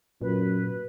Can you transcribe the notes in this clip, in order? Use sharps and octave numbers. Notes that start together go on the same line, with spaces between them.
F#2 A#2 B4